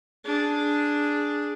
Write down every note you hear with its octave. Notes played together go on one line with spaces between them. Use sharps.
D4 G#4